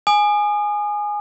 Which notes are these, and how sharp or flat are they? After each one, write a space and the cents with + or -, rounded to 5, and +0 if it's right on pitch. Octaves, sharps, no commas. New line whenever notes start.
G#5 +0 D#6 -35